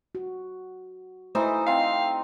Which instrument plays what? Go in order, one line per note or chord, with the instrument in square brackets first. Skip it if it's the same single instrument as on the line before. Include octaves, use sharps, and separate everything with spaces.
[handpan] F#4
[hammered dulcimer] E3 D#4 [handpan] A3 E4 E5 [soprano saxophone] C5
[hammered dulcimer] C4 D#4 [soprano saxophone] F5